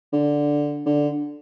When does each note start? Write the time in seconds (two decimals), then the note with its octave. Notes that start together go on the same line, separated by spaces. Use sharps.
0.12 D3
0.86 D3